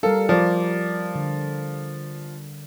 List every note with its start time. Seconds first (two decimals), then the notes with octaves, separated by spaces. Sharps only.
0.03 G3 A4 A#4 F5
0.29 F3 D5
1.15 D3